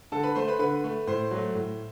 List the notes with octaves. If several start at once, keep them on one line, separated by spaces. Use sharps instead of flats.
D3 A4 A5
B4 B5
A3 C5 C6
B4 B5
D3 B4 B5
A3
A2 C5 C6
F#3
A3
A2